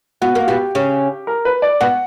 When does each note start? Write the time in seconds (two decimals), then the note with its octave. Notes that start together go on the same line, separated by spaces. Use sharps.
0.21 B3 F#4
0.35 A#3
0.47 B2 B3 G4
0.75 C#3 C#4
1.27 A#4
1.45 B4
1.62 D5
1.81 B2 B3 F#5